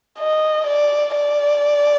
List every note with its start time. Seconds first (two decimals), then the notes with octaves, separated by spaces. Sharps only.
0.19 D#5
0.67 D5
1.14 D5